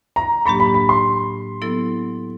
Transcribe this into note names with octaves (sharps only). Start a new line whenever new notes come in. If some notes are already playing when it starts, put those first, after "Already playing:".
A#5
A2 F#3 A#3 D4 G4 B5
B5
B5
C6
F#3 B3 E4 A4